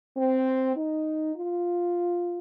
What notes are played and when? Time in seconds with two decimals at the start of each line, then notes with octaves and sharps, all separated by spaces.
0.16 C4
0.76 D#4
1.36 F4